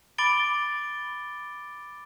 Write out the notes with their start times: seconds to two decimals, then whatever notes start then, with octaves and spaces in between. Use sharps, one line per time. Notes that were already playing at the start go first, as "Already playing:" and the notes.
0.18 B5 D6 A6 D7 G7